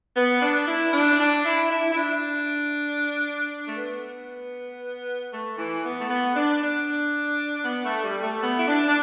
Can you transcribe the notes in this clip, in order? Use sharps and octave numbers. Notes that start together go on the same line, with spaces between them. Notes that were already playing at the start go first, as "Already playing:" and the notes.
B3
D4
E4
D4
D4
E4
E4
E4
D4
A3
B3
A3
E3
B3
A3
B3
D4
D4
B3
A3
G3
A3
B3
E4
D4
D4